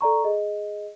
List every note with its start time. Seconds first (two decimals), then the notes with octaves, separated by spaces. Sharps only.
0.01 A4 D5 A#5 C#6
0.24 G#4 D#5